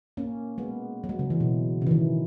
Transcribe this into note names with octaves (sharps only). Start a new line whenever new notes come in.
A#3 C#4
G#3 B3
F#3
G#3
C#3
E3
B2
C#3
E3
D#3